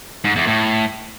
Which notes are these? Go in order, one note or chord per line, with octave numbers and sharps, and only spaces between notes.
G#2
E2
A2